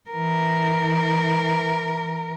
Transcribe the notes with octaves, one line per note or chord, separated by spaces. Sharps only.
E3 A#4